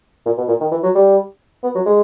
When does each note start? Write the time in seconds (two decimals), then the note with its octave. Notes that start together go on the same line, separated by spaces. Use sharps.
0.26 A#2
0.38 B2
0.48 A#2
0.61 D#3
0.72 E3
0.83 F#3
0.95 G3
1.64 B3
1.75 F#3
1.86 G#3